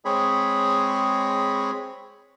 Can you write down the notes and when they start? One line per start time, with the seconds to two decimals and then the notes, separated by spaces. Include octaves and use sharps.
0.05 G#3 C4 G#4 C#5 B5